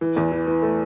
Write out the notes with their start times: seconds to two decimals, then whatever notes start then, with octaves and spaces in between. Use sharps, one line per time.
0.01 E3
0.16 E2
0.32 E3
0.47 E3
0.62 A3